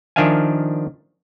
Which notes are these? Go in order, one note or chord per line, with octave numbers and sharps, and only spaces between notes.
D#3 F3 D4 E5 F5 G#5